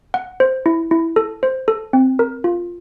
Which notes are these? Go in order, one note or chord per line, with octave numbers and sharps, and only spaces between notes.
F#5
C5
E4
E4
A4
C5
A4
C4
A#4
F4